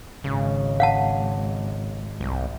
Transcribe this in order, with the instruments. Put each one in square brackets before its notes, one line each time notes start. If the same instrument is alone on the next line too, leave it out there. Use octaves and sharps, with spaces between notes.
[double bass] G#1 G#3 [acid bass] C#3
[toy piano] F5 F#5 A5
[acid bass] C2